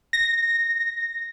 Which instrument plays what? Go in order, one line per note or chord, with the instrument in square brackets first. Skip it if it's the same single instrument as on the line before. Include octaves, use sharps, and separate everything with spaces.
[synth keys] A#6